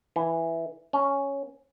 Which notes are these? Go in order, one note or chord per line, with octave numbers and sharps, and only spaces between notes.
E3
C#4